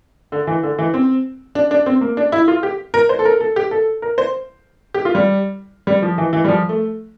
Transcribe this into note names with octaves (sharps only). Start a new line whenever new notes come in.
D3
E3
D3
E3
C4
D4
D4
C4
A#3
D4
E4
F4
G4
A#4
C5
A4
A#4
A4
G4
A4
A#4
C5
G4
F4
G3
G3
F3
E3
E3
G3
F3
A3